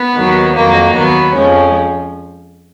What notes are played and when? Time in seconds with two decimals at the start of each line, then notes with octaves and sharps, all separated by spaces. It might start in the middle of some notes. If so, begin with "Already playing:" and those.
Already playing: B3
0.14 D#2 D#3 F#3
0.54 F2 D#3 F#3 A#3
0.95 D#2 D#3 F#3 B3
1.35 F2 F3 G#3 C#4